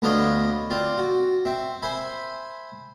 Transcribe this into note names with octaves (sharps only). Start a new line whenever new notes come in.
D2 B3 D4 F4 C#5 D#5
C4 F4 D5
F#4
C4 E5
C5 E5 G#5 B5